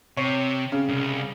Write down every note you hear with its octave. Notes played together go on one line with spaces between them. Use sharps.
C3 C#5
C#3
C2